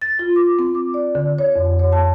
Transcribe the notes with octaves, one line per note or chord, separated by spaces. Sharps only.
A6
F4
D6
C4
D6
D5
D3
C#5
F2
C#5
A5